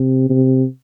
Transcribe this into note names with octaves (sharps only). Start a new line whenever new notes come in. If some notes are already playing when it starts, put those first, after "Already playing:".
Already playing: C3
C3